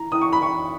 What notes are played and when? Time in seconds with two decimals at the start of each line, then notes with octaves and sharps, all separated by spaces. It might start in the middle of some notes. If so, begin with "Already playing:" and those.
Already playing: E3 A#5
0.12 E3 D#6
0.21 C#6
0.32 B5
0.41 E3 C#6